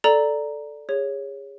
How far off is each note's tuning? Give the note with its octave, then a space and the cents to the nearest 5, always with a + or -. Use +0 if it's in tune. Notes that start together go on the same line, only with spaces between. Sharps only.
A4 -5 D5 +0 A#5 +0
G#4 -30 C#5 +0